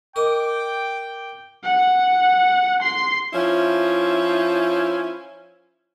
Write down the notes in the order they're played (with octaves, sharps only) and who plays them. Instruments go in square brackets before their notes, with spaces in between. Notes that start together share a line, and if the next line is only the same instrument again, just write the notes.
[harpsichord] A#4 D#5 [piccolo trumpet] G5 [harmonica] D6
[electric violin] F#5
C6 C7
[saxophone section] F3 C#4 E4